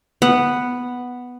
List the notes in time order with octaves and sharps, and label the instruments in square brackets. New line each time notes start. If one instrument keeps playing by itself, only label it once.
[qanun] B3 F#5